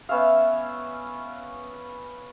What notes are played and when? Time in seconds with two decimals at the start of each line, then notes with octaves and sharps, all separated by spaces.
0.09 B3 C#4 E5 F5